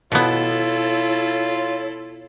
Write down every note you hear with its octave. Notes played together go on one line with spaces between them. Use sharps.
B2 B3 E4 F4 A4 C#5